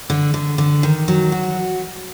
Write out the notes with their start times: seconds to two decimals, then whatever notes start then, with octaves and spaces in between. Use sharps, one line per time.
0.10 D3
0.34 D3
0.58 D3
0.83 D#3
1.08 F#3
1.32 F#4